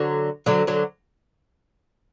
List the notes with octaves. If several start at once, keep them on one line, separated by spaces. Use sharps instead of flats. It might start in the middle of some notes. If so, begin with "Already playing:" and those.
Already playing: D3 F#3
D3 F#3
D3 F#3